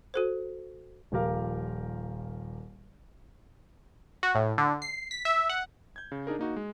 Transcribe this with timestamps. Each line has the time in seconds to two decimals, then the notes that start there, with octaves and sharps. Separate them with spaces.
0.14 F#4 A4 C5
1.12 D#1 F3 G4 A#4 F5
4.23 F#4
4.35 A2
4.58 D3
4.82 C7
5.11 B6
5.25 E5
5.49 F#5
5.96 G6 G#6
6.12 C#3
6.27 D4 D#4 G#4 A#4
6.39 A#3 D#4 F#4
6.56 G#3